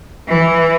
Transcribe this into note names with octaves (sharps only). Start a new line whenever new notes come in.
E3